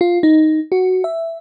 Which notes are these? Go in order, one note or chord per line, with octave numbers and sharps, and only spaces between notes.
F4
D#4
F#4
E5